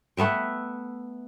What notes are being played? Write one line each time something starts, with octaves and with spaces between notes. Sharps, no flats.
A3 B3 E5 G5